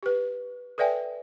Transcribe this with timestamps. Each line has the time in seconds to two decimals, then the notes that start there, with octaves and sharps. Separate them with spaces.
0.03 G4 B4
0.78 A4 B4 D5 E5 G5 G#5